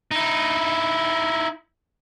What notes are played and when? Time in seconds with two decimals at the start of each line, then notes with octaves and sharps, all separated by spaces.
0.11 D#4 E4